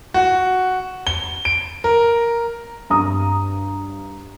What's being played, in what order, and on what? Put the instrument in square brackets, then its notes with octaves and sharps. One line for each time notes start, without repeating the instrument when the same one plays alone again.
[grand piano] F#4
G7
D7
A#4
[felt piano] G2 A#5 D#6